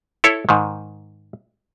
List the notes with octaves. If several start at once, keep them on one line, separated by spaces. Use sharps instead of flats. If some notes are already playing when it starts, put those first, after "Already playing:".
E4 A4 C#5
G#2 D#3